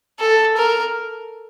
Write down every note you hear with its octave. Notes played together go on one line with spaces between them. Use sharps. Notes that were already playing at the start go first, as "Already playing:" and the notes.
A4
A#4